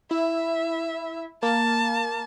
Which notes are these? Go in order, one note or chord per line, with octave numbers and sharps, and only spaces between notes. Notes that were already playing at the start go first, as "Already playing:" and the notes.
E4 E5
A#3 A5